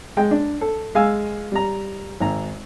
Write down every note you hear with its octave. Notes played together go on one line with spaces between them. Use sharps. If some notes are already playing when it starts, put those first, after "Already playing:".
G#3 G5
D4
A4
G#3 F5 G#5 E6
G3 A#5
G#1 A#5